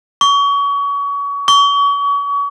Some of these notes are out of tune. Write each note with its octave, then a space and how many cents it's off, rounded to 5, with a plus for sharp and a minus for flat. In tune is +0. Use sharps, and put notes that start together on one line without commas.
C#6 +30
C#6 +40